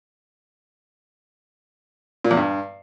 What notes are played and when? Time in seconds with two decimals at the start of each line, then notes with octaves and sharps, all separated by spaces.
2.25 A#2
2.31 E2
2.37 G2